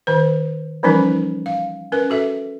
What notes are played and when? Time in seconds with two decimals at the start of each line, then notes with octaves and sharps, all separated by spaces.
0.07 D#3 C5
0.83 E3 F3 G3 C#4 D#4 A#4
1.46 F5
1.92 C#4 A#4 B4
2.10 F#4 A4 E5